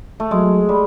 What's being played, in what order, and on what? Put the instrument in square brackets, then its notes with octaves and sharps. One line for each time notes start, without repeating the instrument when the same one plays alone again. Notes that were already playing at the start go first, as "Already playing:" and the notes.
[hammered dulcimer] A3
[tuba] F#3 [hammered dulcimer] G#3
[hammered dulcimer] G3